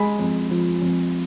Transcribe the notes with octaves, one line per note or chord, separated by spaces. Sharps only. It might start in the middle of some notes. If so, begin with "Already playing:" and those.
Already playing: G#3 G#5 B5
F2
F3
F2